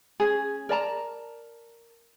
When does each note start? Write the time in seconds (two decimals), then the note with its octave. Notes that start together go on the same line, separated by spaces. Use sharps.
0.20 C#4 G#4
0.69 A#4 D5 A5 A#5